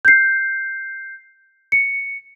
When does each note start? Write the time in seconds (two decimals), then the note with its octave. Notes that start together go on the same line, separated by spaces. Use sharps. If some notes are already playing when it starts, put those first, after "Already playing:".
0.05 G6 C7
1.72 C#7